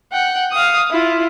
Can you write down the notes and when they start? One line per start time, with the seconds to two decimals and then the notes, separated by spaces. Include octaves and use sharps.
0.12 F#5 G5
0.52 F5 D#6
0.91 E4 F4